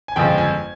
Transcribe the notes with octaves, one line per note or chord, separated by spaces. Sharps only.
G#5
G1 F2 C#3 F3 G#3 G5
G#5